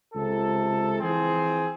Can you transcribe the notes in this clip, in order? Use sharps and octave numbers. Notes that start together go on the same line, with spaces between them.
C#2 C3 A4
E3 F3 C4 G#4